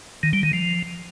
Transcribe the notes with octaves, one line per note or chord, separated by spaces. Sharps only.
D#3
G3
D#3
F3